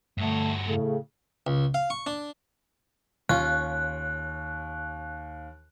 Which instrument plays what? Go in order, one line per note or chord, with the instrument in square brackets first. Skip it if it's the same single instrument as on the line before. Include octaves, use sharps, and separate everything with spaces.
[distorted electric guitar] G2 F#4 [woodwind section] D3 A3
[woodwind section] A2 C#3 [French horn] A3
[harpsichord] C#2
F5
C#6
D4
[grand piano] D#2 [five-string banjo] C#4 F4 [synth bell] F#6